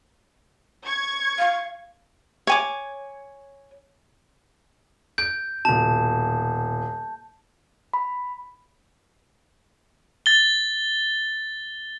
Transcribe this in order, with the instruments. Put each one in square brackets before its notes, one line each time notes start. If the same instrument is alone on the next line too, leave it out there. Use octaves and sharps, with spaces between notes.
[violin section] C#6 G#6
[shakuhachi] F5
[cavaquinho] C#5 G#5 D6
[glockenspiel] G6 [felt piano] D7
[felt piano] D#1 B2 [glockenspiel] A5
[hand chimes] B5
[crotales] A6 G7